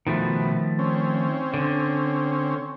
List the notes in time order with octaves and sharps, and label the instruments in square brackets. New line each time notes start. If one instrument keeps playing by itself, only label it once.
[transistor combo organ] B2 [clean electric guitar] D#3 F3 A3
[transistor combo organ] C4 C#4
[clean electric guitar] D3